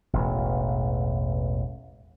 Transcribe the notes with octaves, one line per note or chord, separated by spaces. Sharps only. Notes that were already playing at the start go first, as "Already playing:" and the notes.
E1 A1